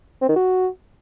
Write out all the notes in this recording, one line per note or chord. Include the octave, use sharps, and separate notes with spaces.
C4
D#3
F#4